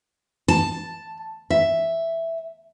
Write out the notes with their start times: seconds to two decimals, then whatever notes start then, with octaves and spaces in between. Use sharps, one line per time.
0.48 A5
1.50 E5